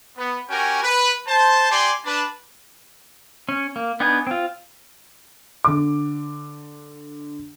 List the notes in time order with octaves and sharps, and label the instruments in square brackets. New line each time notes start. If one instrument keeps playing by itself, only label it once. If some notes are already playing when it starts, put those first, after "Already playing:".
[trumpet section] B3
C#4 F#4 G4 A#4 G5 G#5
B4
C5 A5
G4 D5 G#5 C6
D4 B4 A5
[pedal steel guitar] C#4
A#3
B3 D4 D#4 B4 G#5
C4 F4
[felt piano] D3 D6